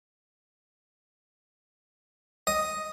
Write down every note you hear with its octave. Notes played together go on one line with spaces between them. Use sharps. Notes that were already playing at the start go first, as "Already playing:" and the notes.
D#5